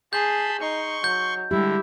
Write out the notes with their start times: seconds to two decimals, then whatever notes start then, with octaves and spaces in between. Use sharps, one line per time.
0.13 G#4 A5 B5 C6 G6
0.60 D#4 C6 C#6
1.04 F#3 G6
1.51 D3 G3 G#3 E4 G4